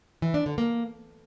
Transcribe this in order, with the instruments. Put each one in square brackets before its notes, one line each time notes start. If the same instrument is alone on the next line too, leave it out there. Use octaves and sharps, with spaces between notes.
[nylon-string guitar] E3
D4
D3
A#3